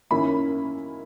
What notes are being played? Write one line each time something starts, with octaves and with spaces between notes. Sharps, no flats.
F#2 D#3 A#3 C#4 E4 B5